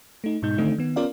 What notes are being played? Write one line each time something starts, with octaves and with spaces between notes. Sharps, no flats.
A3 D#4
G#2 B2 G#3 D#4 G6
D3 D#3 A3 C4 D4 D#4
D#3 B3
B3 C#4 F4 A#4 D5 F5